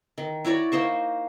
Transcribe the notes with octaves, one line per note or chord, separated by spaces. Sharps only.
D#3
E4 F#4 C#5 D5
A#3 D#4 C5 C#6